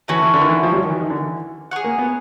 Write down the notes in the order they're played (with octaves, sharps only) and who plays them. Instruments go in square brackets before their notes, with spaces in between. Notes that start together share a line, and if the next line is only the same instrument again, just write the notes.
[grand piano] E3 [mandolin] A3 C#4 F#4 B4
[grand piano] E3
D3
D#3
E3
F3
G3
F#3
D#3
E3
D#3
D3
E3
[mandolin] G#4 C#5 F#5
[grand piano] A#3
B3